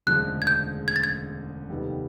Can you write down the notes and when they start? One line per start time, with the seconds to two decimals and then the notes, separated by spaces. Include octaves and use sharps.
0.07 E1 D2 C#3 F3 G#3 F#6
0.42 G#6
0.47 G6
0.88 G#6
0.96 A6
1.04 G#6
1.69 F1 D#2 D#3 G3 B3